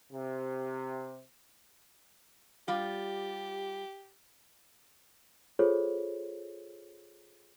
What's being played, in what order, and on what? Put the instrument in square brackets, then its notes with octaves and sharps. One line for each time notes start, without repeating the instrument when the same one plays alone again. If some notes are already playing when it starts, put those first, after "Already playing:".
[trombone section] C3
[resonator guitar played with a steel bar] G3 F4 [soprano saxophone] G4
[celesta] F4 G#4 A4 C5 C#5